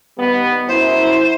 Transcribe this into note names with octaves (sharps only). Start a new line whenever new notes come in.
D#3 G3 B3
F#2 E4 C5